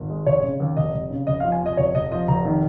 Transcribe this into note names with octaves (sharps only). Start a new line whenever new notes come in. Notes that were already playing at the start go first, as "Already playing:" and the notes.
Already playing: G#1
G#3
F1 C#5
C#3
D#2
F1 D#5
F1
C#3
F1 D#5
F5
F3
G#5
F2 D#5
F1 C#5
F1 D#5
F3 D#5
F1 A#5
D#3